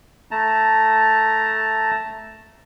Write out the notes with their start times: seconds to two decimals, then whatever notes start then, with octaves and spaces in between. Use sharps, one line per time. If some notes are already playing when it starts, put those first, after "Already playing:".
0.31 A3 A5 A#5